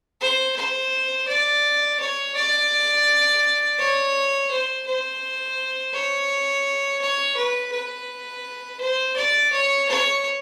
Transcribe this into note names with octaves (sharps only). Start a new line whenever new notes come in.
C5
C5
D5
C#5
D5
C#5
C5
C5
C#5
C#5
B4
B4
C5
D5
C#5
C#5